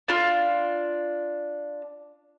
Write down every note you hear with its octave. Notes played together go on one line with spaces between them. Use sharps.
D4 F4